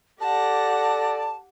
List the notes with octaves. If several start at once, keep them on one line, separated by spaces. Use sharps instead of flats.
G4 A4 D5 F#5 A5 A#6